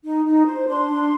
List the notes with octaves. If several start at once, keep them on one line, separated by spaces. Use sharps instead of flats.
D#4
D#4
C5
D4 C6
D4